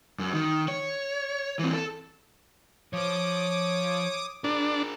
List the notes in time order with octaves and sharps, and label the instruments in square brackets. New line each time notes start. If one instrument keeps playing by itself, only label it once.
[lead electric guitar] F#2
D#3
C#5
E3 C4
A4
[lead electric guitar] F3 C5 [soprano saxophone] C#5 [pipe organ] D6 D#6
[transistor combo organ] D4 [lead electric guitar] G#4 A#4